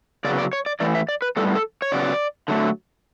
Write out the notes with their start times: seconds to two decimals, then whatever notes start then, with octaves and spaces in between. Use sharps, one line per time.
0.24 C#3 F#3 B3 D5
0.38 D5
0.53 C#5
0.66 D5
0.80 A2 E3 A3 D5
0.95 E5
1.09 D5
1.22 B4
1.36 A2 G3 B3 A4
1.55 A4
1.82 C#5
1.92 C#3 F#3 B3 D5
2.48 D3 F#3 A3